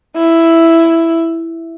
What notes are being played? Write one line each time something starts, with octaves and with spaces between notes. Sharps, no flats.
E4